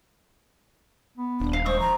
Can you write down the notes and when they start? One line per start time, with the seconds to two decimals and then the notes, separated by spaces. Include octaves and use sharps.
1.17 B3
1.40 D#1 D4
1.53 F5
1.66 G#3 C5 C#6 D#6
1.80 F3 A#5